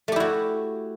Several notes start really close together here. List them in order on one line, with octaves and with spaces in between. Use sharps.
A3 G4 E4 F#4